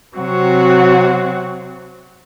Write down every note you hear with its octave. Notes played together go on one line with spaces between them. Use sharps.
C3 F#3 C4 F#4